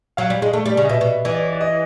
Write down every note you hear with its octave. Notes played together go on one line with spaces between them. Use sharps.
F#3 F5
G3
G#3
A3
G3
C#3
D#5
B2 E5
B2
E3 D#5
D5
C#5
D5
D#5